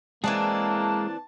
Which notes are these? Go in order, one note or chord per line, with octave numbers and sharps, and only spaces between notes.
E3 G#3 A#3 C4 D4 G#4 A5